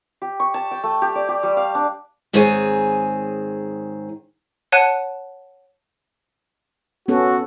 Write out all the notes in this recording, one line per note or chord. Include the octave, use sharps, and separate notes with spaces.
G4
C#6
A5
G5
A3
G4
D5
G4
G3
F5
D4
G#2 D#3 C4 G#4 C#5 G#5
C#5 F#5 A5 F#6 D#7
B3 C#4 F#4 A4